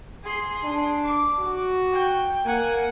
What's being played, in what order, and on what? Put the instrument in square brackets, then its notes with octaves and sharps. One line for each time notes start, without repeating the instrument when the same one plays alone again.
[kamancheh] G#4 C6
[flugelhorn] D4
[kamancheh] D6
[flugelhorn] F#4
[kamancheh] G5
[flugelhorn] A#3 [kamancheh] F#5 G#5